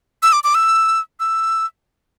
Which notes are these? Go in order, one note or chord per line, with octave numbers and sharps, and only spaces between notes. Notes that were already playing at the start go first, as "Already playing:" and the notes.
E6
D6
D6
E6
E6